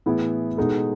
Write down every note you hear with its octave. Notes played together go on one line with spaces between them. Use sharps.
A2 E3 B3 E4 G#4
B2 G#3 D#4 A4